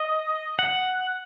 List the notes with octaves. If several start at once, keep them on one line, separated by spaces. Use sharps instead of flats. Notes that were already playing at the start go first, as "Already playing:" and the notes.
Already playing: D#5
F#5